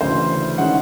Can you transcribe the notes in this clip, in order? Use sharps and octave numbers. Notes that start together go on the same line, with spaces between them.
D2 C#3 E3 C5
D#3 G#3 C#4 E4 F#5